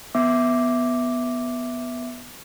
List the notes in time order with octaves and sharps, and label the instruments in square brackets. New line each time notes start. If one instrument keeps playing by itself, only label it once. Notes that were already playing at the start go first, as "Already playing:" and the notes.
[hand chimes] B3 E5 D6